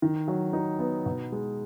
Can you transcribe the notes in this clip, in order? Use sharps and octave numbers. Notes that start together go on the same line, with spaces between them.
D#3
F#3
D#4
B3
B2
G#3